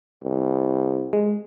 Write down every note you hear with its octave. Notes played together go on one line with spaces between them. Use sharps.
C2
G#3